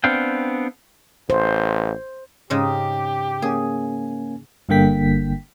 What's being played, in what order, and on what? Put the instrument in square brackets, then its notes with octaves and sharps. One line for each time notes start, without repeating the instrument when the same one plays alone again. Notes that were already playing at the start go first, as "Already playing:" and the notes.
[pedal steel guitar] B3 C4 D4 F5 G5
[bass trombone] A1 [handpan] C5
[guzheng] G#2 C#3 D#5 [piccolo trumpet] G4
[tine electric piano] A#3 C#4 G#5 [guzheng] G#4
[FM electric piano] G1 G2 D3 A#3 G5 B6